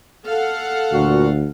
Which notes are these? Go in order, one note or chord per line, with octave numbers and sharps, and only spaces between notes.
A4 F5 F#5
D2 A#2 F#4